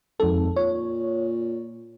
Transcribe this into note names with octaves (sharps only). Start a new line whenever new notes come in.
G#1 F2 A4
A#2 C#5